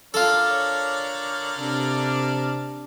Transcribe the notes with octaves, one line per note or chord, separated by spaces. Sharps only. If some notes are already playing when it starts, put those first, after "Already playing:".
D3 F4 A4 A#4 D5
C#5
C3 D4